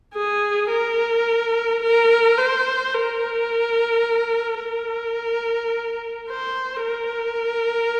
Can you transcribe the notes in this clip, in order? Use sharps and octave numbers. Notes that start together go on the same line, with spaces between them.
G#4
A#4
A#4
C5
A#4
A#4
C5
A#4